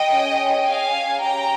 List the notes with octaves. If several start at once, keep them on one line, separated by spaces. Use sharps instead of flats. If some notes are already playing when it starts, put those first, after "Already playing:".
Already playing: D#5 G5
C#4 G#4
C#4 G#4 F5 G#5
C#4 G4 G5 A#5